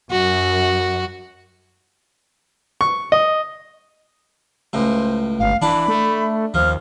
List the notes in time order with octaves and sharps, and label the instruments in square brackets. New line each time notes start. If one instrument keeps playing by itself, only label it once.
[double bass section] F#2 [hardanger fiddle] F#4
[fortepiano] C#6
D#5
[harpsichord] C#2 A2 [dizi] C5
[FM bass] G1 [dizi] F5
[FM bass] E3 [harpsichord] D4 A5 [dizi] B5
[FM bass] A3
[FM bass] D#2 [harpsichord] F3 [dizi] F6